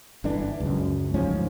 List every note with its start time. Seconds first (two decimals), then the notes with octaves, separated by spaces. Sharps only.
0.24 G1 D3 E3 D4
0.60 C#2 F#2
1.14 D2 G#2 F3 C#4